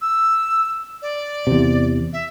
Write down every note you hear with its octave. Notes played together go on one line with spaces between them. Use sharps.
E6
D5
E2 C3
E5